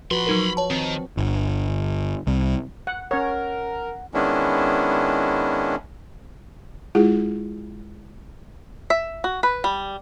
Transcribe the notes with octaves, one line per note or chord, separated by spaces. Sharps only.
F3 F#4 B4 B5 C6
F#3 D#4 A#4
C#5 A5
D#3 C4
G1
C2
F#5
C#4 A#4 C#5 F#5
D#3 G#3 B3 C#4 D4 E4
G#3 E4 F4 G#4
E5
F#4
B4
G3